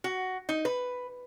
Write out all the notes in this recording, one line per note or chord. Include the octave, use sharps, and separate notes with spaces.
F#4
D#4
B4